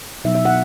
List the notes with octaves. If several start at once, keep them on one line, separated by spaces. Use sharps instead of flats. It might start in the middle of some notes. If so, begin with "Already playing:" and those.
B2 F#3 B3 D#4 E5
E5
F#5